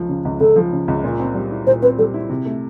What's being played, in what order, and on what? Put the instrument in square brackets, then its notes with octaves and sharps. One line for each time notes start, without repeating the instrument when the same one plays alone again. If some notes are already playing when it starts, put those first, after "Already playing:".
Already playing: [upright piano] C#2 F3
C#3
C#2
[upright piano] C#2 [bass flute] A4
[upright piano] F3
C#3
C#2
A#2
C4
G3
E4
[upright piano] A#2 [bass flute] C5
[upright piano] C4 [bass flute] B4
[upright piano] G3 [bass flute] A4
[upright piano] E4
C3
A3